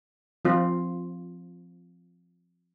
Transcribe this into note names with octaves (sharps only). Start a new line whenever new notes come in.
F3 C4 F4